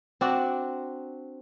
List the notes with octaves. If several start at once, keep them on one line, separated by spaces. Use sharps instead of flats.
C4 D4 F#4